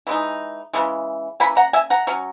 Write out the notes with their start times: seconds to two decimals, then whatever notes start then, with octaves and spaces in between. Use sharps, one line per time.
0.07 E3 G#3 D#4
0.73 C#3 E3 G#3
1.40 E3 A#3 C#4 G#5 B5
1.57 F#5 A#5
1.73 E5 G#5
1.90 F#5 A#5
2.07 F#3 C#4